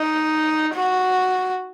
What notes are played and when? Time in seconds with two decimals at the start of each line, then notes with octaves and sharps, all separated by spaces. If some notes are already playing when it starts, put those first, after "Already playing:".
Already playing: D#4
0.74 F#4